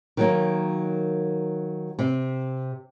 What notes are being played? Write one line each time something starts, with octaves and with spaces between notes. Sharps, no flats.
D#3 F#3 A#3
C3